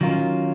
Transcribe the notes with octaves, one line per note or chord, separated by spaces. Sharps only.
D#3 F#3 C#4 F4 A#4